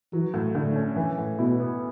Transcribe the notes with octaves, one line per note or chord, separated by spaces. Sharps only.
E3 F#3
A2
A2 D3
C#4
E3
A2
B2 E4
B3